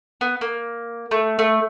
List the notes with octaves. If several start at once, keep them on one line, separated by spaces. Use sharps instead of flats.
B3
A#3
A3
A3